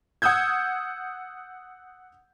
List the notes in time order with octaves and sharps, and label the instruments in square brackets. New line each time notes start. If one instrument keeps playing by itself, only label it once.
[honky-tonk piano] F#5 D#6 E6 G6 G#6